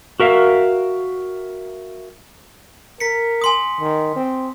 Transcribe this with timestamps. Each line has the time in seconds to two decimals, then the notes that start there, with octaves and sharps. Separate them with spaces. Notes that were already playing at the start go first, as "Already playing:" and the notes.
0.20 F#4 A#4 E5 F5
3.00 A#4 B6 C#7
3.42 G#5 C6 D#6
3.81 D#3
4.16 C4